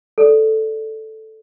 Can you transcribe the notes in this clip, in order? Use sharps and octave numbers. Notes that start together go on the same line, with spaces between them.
A4 D5